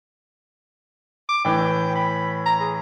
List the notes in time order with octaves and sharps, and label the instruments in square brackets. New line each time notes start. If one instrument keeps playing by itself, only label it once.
[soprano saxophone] D6
[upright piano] A2 E3 [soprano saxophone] G5
[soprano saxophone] B5
A#5
G#4